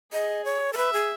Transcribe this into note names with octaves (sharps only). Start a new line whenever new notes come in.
G#4 D#5
C#5
A4
B4 E5
G#4